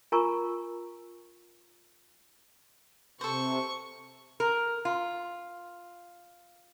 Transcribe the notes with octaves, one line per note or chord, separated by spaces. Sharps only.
F4 A#4 G#5 A#5 C#6
C3 A4 C5 C#6
A#4
F4